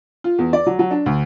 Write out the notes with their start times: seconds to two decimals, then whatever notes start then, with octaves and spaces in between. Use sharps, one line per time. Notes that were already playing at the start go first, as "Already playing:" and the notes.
0.24 F4
0.39 E2
0.53 D5
0.67 F#3
0.79 F#3
0.91 D4
1.06 D2